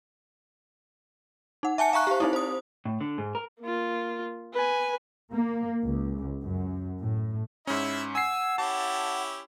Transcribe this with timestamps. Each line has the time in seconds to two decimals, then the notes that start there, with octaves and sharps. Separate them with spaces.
1.63 D#4 F#5
1.78 E5 G#5 A5 C#7
1.93 F5 A#5 C#6 F#6
2.07 G4 C5
2.20 C4 D#4 E4
2.33 C5 D#6
2.85 A2
3.01 D3
3.18 G#2
3.35 A#4
3.61 A#3 F4
4.54 B4 G#5
5.31 A#3
5.82 C#2
6.42 F#2
7.00 A2
7.67 G#2 C#4 E4 E5
8.15 F#5 G#5 E6 C7
8.58 C#4 E4 G4 A5